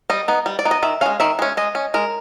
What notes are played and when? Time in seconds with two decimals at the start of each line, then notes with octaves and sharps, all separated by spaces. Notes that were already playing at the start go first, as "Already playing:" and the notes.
0.10 G3 D#5
0.28 B3 D#4
0.46 G3
0.59 D5
0.65 B3 D#4
0.71 D#5
0.83 D#3 E5
1.01 G#3 C#4 F5
1.20 D#3 E5
1.39 G#3 C#4
1.57 G#3 D#5
1.75 C#4
1.94 G#3 A#4